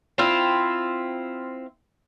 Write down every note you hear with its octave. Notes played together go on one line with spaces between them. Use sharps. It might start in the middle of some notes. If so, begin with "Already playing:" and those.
C4 E4 F4